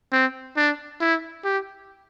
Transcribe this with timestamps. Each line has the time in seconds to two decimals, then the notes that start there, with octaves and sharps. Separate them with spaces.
0.12 C4
0.57 D4
1.01 E4
1.45 G4